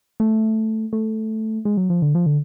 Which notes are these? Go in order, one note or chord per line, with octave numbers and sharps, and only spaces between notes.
A3
A3
G#3
F#3
F3
D3
F3
D3